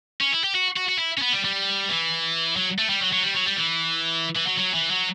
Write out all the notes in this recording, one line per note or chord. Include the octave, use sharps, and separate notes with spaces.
C#4
E4
G4
F#4
F#4
F#4
E4
C#4
B3
G3
G3
E3
F#3
A3
G3
F#3
F#3
G3
F#3
G3
E3
E3
F#3
F#3
E3
F#3